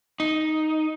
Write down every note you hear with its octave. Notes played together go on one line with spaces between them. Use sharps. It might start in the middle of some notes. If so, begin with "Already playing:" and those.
D#4